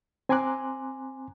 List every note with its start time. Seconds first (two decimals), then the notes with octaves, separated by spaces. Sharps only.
0.29 C4 G#5 A#5 C6 D6 F#6